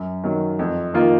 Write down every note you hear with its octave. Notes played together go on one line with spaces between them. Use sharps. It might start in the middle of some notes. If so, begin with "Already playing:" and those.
Already playing: F#2
D#3 F#3
F2
D#3 A#3 F4